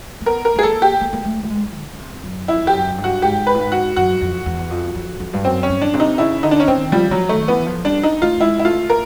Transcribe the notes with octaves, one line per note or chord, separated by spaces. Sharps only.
A#3
B3 A#4
A#4
B3
G#4
A#3 A4
G4
A#3
A#3
A3
A3
G#3
D3
C3
F#2
F2 E4
F2 G4
F#2
G2
F#4
G#2 G4
B4
A2
G#2
F#4
F#2 F#4
F2
E2
F2
F2
F2
G2
F#2 C4
C#4
G2
D4
C3
D#4
C#3 E4
D3 D#4
D4
C#4
D#3 C4
F3 G3
F3 F#3
D#3 A3
E3 B3
F3
G3 D4
D#4
A3 F4
G#3 E4
E4
A3 F4
A#3 A#4